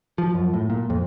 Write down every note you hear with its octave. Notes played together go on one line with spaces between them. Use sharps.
F3
F#2
A2
A#2
F2